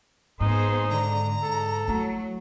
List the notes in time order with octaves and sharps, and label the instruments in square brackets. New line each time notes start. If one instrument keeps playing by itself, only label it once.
[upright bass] G#2 [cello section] B3 G#4 C5 [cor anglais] D#4
[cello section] D3 [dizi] A#5
[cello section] G#2 [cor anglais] A4
[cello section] F#3 [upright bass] A3 E4